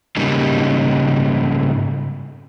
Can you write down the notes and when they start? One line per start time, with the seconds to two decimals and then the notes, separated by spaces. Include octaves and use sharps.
0.16 G#2 C#3 G3 A#3 D#4